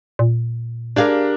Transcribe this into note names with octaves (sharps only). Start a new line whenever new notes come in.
A#2
D4 G4 G#4 A#4 F5